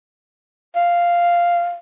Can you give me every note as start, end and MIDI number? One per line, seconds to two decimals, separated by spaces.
0.76 1.76 77